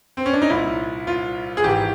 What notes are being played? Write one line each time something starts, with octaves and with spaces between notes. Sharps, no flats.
C4
C#4
D4
D#4
C2 A#2 E4
F4
G#4
G#1 G#2 E3 G4